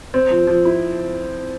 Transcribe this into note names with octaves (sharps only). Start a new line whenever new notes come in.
C4
F3
F3
E4